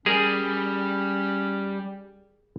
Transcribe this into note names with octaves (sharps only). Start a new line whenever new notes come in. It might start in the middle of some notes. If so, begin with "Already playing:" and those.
G3 C#4 G#4 A#4 G#5